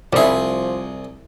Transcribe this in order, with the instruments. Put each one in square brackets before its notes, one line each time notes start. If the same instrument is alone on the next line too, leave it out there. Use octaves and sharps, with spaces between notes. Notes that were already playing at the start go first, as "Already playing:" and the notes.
[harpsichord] C2 G#4 [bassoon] F3 [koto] G3 E4